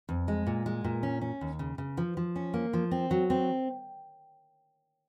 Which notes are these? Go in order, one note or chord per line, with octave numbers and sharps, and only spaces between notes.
F2
G#3
A#2
G#3
A#2
C#4
C#4
D#2
C#3
C#3
F3
F3
C#4
A#3
F3
C4
F#3
C4